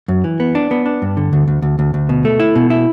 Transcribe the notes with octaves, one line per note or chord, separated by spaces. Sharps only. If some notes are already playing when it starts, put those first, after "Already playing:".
F#2
E3
B3
D4
B3
D4
G2
D3
D2
D2
D2
D2
D2
B2
A3
E4
B2
E4